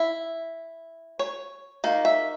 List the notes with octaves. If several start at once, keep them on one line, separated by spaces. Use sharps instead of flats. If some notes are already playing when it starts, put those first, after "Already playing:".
Already playing: E4
C#5
D#3 A#3
E5